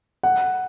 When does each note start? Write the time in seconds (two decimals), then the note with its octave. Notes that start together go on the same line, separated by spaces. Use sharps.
0.23 F#5